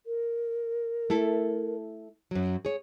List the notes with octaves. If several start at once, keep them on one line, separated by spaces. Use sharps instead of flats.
A#4
A3 E4 A4
F#2 F#3
G#4 C#5